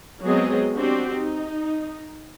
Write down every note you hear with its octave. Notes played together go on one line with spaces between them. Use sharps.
F#3 G#3 B3 C4 G#4 D#5
C4 D4 F#4 G4
D#4